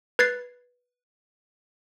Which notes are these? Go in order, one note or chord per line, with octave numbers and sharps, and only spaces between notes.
B4 G#6 A6 C7